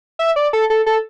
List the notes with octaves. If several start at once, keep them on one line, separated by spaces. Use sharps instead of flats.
E5
D5
A4
A4
A4